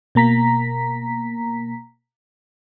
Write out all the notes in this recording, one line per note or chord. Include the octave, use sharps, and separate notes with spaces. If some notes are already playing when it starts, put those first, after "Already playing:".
B2 A#3 A#5 B6